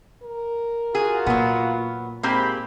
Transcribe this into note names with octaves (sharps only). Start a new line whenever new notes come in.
A#4
F4 F#4 G#4
A#2 F#3 B3
G#2 A#3 C4 G4 B5